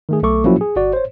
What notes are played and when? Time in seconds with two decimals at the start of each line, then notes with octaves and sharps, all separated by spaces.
0.09 D#3 A3 G#4
0.23 B1 A3 A4 C#6 D6
0.44 F3 F#3 A#3 C#4 E4 F#4
0.61 G#4
0.76 G1 F#4 D5
0.93 C5 C#5